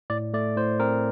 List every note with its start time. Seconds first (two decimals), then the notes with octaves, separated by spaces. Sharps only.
0.10 A2 D5
0.34 A3 D5
0.56 A2 C5
0.80 C4 A#4